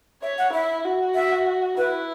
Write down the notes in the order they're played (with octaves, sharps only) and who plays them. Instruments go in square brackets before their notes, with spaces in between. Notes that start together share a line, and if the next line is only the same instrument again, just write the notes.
[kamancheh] C#5 [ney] E5
[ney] F#5
[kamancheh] E4 [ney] E5
[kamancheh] F#4
[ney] E5
[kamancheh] E4 [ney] B4